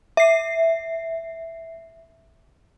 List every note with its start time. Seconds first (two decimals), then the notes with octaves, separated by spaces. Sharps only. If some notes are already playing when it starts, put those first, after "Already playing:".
0.17 E5 C7